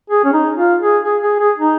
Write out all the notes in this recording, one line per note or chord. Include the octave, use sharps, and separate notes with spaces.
G#4
C#4
D#4
F4
G#4
G#4
G#4
G#4
D#4